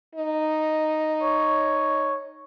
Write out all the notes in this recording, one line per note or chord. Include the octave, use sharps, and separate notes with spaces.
D#4
C#5